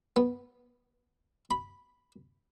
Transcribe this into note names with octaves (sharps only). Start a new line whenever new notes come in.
B3
B5